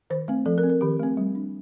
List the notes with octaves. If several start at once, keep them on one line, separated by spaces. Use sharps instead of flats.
D#3 C5
A3 C4
F3 A4
A#4
C4
A#4
D#3 G4
A3 C4
G3
D4